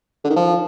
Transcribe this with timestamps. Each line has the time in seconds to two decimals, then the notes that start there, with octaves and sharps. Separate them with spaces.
0.24 D3
0.30 D#3
0.36 F3